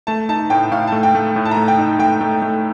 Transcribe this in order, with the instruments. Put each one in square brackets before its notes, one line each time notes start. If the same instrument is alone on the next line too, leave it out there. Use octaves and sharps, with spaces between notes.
[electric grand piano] A3 [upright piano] A5
[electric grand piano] D#4 [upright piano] A5
[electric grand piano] A2 [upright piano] G5
[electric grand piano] A2 [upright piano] F5
[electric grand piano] A3 [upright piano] A5
[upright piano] G5
[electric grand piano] A3
A2
[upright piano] A5
A#5
[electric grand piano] A3
[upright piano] G5
[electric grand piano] D#4
[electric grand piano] A3 [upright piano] G5
[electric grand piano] A3
A3